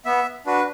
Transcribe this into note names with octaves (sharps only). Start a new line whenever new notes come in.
B3 E5
D4 F#4 B4